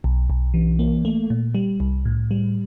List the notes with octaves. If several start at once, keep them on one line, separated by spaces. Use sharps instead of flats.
B1
B1
E3
A#3
A3
A#2
G3
C2
A2
G3